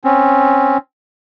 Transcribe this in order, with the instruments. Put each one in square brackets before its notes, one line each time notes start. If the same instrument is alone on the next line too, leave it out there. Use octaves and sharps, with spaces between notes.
[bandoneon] C4 C#4